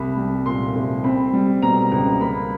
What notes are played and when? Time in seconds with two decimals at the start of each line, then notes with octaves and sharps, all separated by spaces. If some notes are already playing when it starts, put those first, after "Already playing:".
Already playing: C2 B5
0.17 G3
0.46 A#2 C6
0.75 C2
1.04 C4 B5
1.33 G3
1.62 B2 A#5
1.92 C#2 A#5
2.20 A#3 B5